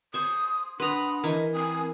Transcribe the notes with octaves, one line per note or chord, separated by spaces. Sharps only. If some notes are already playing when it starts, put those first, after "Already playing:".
C5 C#6 D#6
D4 B4 F#5 A#5 C6 D#6
E3 A#4 D#5
C4 G#5 D#6